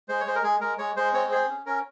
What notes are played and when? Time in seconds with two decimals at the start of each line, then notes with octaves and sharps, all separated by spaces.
0.08 G#3 C5
0.20 C#5
0.26 G#3 C5
0.35 A#4
0.43 G#3 G#4
0.61 G#3 A#4
0.78 G#3 C#5
0.96 G#3 C5
1.13 C4 C#5
1.31 G#4 C5
1.49 C#4
1.66 C#4 A#4